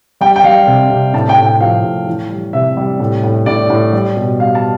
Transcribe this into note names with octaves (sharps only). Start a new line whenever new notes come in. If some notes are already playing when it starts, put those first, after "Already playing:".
G3 G5
G5
G3 F5
C3
C3
A2 A5
G5
A2
G5
F3 F5
A2
E3
G3
C3 E5
G3
A2
A2
A2 D5
A2
G3
B2
G3 F5
A5